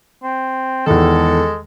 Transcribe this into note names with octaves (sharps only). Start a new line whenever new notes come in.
C4
E2 D#3 G#3 A4